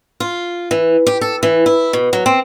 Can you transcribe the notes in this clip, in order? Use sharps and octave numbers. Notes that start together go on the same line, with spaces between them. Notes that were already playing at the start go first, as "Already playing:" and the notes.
F4
E3
G4
A4
E3
E4
B2
F#3
C4